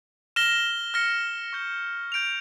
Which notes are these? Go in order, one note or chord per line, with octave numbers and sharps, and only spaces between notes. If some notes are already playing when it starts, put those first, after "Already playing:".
F6 A#6 E7 G7
F6 A#6 C#7
C#6 G6 A#6 E7 G7
G6 D7 F7